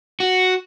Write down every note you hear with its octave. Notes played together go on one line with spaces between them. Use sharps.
F#4